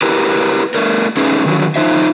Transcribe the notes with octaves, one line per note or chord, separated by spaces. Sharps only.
E4 G4 A#4 B4
A3 D4 A#4
A3 C#4 D#4 G#4 B4
D3 D#3 F#3
D#4 F4 C5 E5